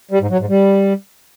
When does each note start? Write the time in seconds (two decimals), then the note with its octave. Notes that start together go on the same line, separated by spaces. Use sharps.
0.11 G3
0.21 G#2
0.30 F#3
0.40 G#2
0.49 G3